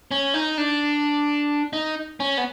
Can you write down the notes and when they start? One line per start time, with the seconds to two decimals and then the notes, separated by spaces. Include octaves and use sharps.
0.11 C#4
0.34 D#4
0.58 D4
1.73 D#4
2.20 C#4
2.37 B3